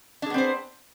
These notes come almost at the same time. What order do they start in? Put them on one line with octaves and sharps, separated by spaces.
D4 G#4 B3 C4 C5